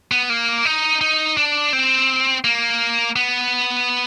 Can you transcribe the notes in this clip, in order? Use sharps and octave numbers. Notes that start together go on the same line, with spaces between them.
B3
A#3
D#4
D#4
D4
C4
A#3
B3